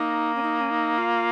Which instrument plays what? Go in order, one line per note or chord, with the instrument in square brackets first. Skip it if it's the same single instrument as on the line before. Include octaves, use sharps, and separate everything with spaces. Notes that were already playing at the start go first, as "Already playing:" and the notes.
Already playing: [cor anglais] A#3 [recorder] D#4
[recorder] C#4
D#4
C#4
D#4
F4